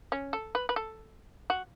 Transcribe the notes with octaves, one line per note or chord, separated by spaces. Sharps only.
C#4
A4
B4
B4
A4
F#4